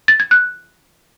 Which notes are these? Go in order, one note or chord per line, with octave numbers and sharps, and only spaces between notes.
A6
G#6
F#6